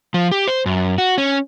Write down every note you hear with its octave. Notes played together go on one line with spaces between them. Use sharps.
F3
G4
C5
F#2
F#4
C#4